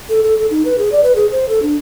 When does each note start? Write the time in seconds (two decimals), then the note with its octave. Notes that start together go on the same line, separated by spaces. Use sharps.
0.09 A4
0.23 A4
0.39 A4
0.51 D#4
0.65 B4
0.78 G#4
0.92 D5
1.04 B4
1.16 G#4
1.32 C5
1.49 A4
1.62 D4